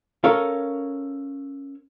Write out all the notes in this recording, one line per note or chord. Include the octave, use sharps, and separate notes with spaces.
C#4 A4 A#4 F5